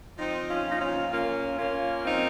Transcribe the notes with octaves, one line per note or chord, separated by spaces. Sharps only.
F3 C4 D#4
C#4 F4
A#2 D#4
C#4 F4
A#3 C#4 F4
A#3 C#4 F4
F3 C4 D#4